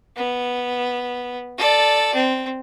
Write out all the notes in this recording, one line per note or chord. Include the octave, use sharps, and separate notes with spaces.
B3
A4 D5
C4